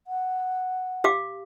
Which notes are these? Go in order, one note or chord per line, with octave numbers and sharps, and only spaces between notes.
F#5
G4 F5 D6